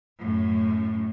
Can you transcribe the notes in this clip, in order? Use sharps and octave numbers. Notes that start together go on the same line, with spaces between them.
F#2 A2